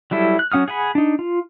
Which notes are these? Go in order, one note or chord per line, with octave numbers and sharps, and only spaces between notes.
F#3 G3 E4 A4
F#6
F#3 C#4 F#5 D#6 F6
G#4 F#5 G#5 B5
D4 D#4
F4